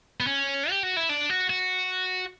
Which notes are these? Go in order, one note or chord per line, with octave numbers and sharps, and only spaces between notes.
B3
C#4
G4
F#4
E4
D4
F#4
F#4